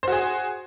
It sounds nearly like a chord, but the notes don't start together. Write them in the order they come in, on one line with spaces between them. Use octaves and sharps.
C5 F#4 G#4